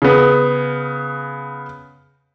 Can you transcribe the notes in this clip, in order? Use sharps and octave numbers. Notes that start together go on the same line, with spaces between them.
C#3 B3